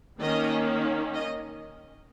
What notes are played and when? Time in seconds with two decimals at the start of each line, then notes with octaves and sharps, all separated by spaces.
0.19 D#3 A#3 C#4 D#5
1.14 D#5